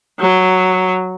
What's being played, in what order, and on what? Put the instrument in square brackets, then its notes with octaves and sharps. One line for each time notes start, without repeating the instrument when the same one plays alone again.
[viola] F#3